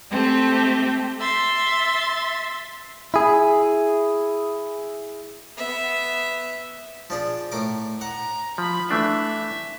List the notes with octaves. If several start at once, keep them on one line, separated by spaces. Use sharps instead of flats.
A3 C4 G4
E5 C6 A6
E4 G#4
B3 E5
F3 D4 G#4
A2 A#4 D6
F#5 A#5
F3 B5
E3 A3 D4 E5